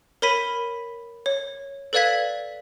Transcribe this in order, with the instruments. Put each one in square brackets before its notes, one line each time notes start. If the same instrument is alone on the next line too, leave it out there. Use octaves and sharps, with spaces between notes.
[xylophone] A#4 C#5 B5 B6 D#7
C#5
A4 B4 D5 F5 G#6 B6